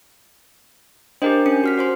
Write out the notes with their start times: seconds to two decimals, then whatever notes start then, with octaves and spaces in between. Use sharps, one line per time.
1.22 D4 G4 A#4 C5 D#5 G5
1.46 C#4 C#7
1.64 F#4 F6 B6
1.78 F#4 C5 C6